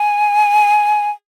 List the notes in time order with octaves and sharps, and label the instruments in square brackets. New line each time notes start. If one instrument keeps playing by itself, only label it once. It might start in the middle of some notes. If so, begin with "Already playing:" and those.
Already playing: [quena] G#5